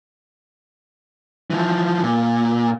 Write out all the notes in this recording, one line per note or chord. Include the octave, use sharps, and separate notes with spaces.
E3 F3
A#2